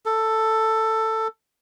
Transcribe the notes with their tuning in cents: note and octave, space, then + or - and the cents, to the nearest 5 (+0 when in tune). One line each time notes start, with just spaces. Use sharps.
A4 +10